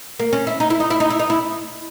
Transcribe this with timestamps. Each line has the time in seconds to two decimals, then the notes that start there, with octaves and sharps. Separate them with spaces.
0.19 A#3
0.33 C#4
0.47 E4
0.60 D#4
0.70 E4
0.80 D#4
0.90 E4
1.00 D#4
1.10 E4
1.19 D#4
1.30 E4